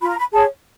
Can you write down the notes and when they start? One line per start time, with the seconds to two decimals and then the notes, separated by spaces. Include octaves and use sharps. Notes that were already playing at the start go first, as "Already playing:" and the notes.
0.02 F4 B5
0.09 A#5
0.18 B5
0.33 G#4 C#5 A5